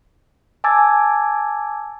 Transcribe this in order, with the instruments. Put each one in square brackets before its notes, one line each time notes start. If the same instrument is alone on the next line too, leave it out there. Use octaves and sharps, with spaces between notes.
[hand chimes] G#5 A5 D6 E6 G#6 A6